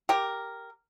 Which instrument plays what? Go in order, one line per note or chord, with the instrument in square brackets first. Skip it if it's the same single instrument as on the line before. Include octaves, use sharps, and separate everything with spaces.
[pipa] G4 A#4